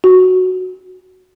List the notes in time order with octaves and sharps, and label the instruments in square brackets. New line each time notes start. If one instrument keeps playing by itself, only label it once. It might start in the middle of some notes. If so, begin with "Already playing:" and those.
[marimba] F#4